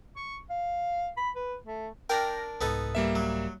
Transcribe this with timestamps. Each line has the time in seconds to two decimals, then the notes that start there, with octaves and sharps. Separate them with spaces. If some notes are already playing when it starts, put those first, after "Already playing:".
0.16 C#6
0.50 F5
1.17 B5
1.36 B4
1.64 A3
2.10 D4 A#4 G5 F6 A#6
2.61 C2 G#2 B3 D#4 A4
2.95 G3 A#3 E5
3.15 F#3